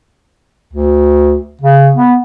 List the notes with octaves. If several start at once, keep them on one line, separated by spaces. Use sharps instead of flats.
D2
C#3
B3